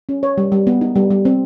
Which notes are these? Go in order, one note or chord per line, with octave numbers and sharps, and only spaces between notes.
C#4
C#5
G3
G3
B3
D#4
G3
G3
C4